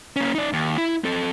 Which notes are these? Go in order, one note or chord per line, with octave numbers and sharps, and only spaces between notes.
A#3 C#4
D#4 D5
D#2
E4
C4 A4